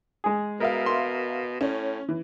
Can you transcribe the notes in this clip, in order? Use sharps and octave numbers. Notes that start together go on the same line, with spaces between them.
G#3 G#4
B2 A#4 E5 F5
C6
A2 C#4
E3